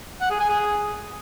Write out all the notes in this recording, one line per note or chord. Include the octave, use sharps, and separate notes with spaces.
F#5
G#4
G#5
G#4